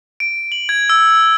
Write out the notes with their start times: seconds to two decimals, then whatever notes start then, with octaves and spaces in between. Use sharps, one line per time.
0.20 D7
0.52 F#7
0.69 G#6
0.90 E6